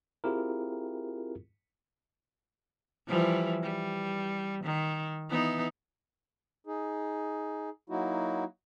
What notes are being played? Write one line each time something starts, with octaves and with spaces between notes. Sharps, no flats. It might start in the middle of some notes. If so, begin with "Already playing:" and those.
C4 E4 F4 G4 G#4 A#4
E3 F3 G3
G3
D#3
E3 B3 D#4
D#4 G#4
F#3 A#3 D#4 E4 F#4